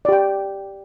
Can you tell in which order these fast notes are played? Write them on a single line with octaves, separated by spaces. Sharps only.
D5 G4 G5